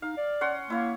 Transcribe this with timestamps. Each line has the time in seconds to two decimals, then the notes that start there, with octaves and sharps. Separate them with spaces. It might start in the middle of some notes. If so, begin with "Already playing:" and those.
0.02 D#4 F5
0.17 D5
0.41 C#4 F#5 C6
0.70 A#3 E4 C#5